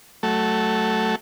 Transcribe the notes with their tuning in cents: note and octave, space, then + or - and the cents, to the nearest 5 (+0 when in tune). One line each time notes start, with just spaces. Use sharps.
F#3 +15 A3 +0